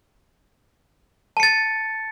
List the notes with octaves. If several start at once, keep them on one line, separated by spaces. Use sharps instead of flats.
A5 A6 C#7